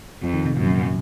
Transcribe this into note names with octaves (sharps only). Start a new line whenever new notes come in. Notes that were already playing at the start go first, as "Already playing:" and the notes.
F2 F3
D#3
C3
F#2 A#2